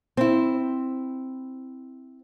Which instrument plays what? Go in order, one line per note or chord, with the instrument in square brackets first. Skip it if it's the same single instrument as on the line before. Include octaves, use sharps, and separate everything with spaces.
[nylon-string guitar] C4 E4